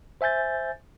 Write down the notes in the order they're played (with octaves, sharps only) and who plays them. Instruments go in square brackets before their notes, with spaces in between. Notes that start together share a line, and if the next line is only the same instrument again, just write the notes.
[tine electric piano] C5 E5 G#5 G6 A6